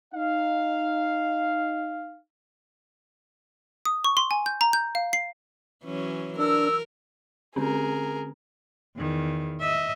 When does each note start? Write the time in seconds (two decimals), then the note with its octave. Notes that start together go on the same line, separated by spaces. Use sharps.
0.14 D#4 F5
3.85 D#6
4.04 C#6
4.17 C6
4.31 G#5
4.46 G6
4.61 A#5
4.73 G6
4.95 F5
5.13 C7
5.85 E3 F#3 C#4
6.39 D4 A#4 E6
7.56 D3 C4 C#4 G#4 A#4
8.97 E2 D#3
9.60 D#5 E5